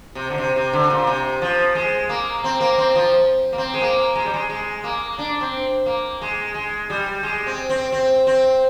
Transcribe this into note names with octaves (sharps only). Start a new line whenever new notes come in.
C3
D3
C3
C3
D3
A#2
C3
F3
G#3
A#3
C4
A#3
C4
F3
A#3
C4
G#3
A#3
G#3
G3
G#3
G#3
A#3
D4
C4
A#3
G#3
G#3
G3
G#3
C4
C4
C4
C4